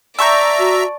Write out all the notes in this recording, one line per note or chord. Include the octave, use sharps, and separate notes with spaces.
D5 E5 A5 A#5 C#6 G6
F#4